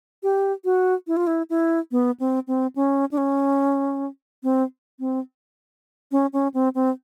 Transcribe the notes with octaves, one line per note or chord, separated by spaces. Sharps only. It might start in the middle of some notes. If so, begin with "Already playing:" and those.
G4
F#4
E4
F4
E4
E4
B3
C4
C4
C#4
D4
C#4
C4
C4
C#4
C#4
C4
C4